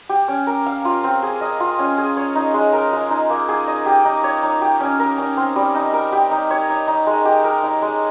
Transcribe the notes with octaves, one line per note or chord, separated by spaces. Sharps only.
G4
C#4
A#4
F5
F4
C4
G#4
D#5
F4
C#4
G#4
C#5
D#4
G#3
A#4
G#3
D#4
A#3
G#4
D#5
G4
D#4
C#5
D#4
G4
C#4
A#4
C#4
C4
G3
D#4
A#4
G4
D#4
C#5
D#4
D#4
G#3
G4
A#4
D#4
G#3